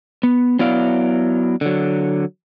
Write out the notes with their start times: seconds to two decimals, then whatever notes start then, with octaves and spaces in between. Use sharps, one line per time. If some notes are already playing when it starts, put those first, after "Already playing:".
0.23 B3
0.59 F#3 B3 E4 D5 F5
1.61 D3 F#3